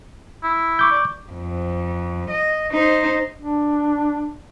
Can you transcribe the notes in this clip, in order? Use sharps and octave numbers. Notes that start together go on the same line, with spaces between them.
E4
C#6 D6 G6
D5
F2
D#5
D#4 C5
D4